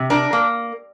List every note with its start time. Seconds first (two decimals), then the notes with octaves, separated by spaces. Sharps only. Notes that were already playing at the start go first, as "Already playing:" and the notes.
Already playing: C3
0.10 D4 A#4
0.33 A#3